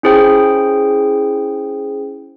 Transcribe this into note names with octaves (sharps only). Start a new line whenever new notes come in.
C#4 E4 G#4 C5 G5